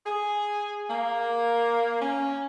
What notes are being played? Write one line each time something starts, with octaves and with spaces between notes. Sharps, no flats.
G#4
A#3
C#4